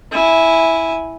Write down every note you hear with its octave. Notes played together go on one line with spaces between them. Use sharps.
E4 G#5